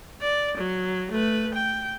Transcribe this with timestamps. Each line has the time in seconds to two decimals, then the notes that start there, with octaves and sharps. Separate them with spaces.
0.22 D5
0.57 F#3
1.11 A3 B4
1.54 G5